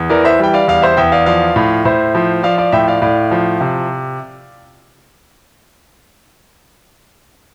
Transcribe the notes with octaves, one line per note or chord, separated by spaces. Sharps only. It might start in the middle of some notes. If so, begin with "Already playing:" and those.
Already playing: E2
E3 A#4 D5
C5 E5
G3 G5
D5 F5
E2 D5 F5
C5 E5
E2 E5 G5
D5 F5
F3 D5 F5
A2
A2 C5 E5
F3
F3 D5 F5
D5 F5
A2 E5 G5
D5 F5
A2 D5 F5
F3
C3